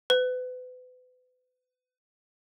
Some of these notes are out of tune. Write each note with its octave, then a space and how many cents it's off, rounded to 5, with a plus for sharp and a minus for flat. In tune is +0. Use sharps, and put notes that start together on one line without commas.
B4 +35